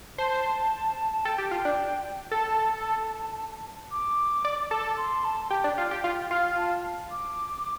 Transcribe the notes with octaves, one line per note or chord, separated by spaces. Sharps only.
C5 A5
A5
A4 G5
G4
F4
D4
A4 A5
D6
D5
A4
C6
A5
G4 G5
D4
F4
G4
F4
F4
A5
D6